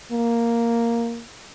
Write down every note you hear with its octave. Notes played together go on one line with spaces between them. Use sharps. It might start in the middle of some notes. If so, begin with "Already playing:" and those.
A#3